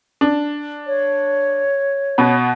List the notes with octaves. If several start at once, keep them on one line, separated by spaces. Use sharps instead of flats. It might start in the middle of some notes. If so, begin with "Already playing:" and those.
D4
C#5
B2 B3